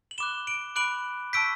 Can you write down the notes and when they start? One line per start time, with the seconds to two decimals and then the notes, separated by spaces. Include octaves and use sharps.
0.11 F#7
0.18 B5 D6 F#6 E7 G7
0.47 D7 F#7
0.76 B5 D6 F#6 D7 F#7
1.33 A5 C#6 E6 G6 B6 D7